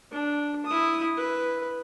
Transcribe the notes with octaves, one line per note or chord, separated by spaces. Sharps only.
D4
E4 D#6
B4